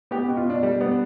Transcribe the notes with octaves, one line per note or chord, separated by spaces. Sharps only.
B3 G4
B2
F4
B2 D4
G3
B3